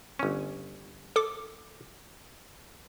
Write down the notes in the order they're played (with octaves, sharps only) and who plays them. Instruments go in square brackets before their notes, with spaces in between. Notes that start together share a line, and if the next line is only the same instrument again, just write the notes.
[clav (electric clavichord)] G1 C#4
[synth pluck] A4 D6